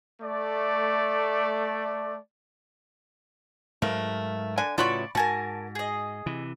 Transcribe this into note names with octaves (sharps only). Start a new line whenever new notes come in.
A3 D5
G#2 F#3 A3 A#4 B4 F5
D3 D4 G#5
A2 C#3 E3 F#3 F4 D5 B5 C#6
G#2 F#4 A#4 G#5 A5
G#4 D#5
C3 E3